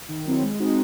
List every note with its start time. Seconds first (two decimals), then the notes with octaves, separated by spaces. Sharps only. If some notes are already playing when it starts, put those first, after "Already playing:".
0.08 D#3
0.25 F#3 C4 E4
0.43 G#3
0.59 C4 D#4 F#4